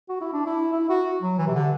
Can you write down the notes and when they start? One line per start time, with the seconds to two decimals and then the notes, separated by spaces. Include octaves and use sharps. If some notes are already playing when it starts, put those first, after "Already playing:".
0.09 F#4
0.21 E4
0.33 D4
0.46 E4
0.73 E4
0.89 F#4
1.22 F#3
1.39 E3
1.47 C3
1.55 D3